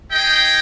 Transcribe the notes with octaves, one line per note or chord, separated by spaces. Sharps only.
D#4 G#4 D#5 G5